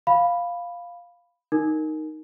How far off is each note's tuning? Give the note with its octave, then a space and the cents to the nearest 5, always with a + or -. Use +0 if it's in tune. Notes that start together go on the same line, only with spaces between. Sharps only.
F5 +0 B5 +0
D#4 +0 A#4 -5